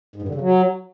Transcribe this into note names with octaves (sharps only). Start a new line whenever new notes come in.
G#2
G2
D3
C#3
F#3